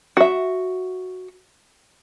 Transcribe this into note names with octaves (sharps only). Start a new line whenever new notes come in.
F#4 E5